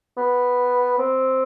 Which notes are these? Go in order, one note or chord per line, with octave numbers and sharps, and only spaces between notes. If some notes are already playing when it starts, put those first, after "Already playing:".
B3
C4